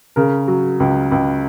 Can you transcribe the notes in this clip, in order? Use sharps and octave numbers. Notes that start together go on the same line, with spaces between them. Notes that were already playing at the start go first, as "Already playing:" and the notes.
C#3 A#4
F#3
C#2
C#2